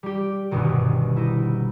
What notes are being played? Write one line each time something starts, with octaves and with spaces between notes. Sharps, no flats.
G3 G4
G1 C2 G2 B2 D#3
D#4 E4